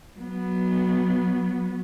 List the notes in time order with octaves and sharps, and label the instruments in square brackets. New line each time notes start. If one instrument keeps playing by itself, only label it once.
[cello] F#3 B3